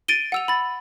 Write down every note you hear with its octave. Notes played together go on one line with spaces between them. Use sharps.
A6 D7 D#7 G7
F#5 E6 F7
B5 A6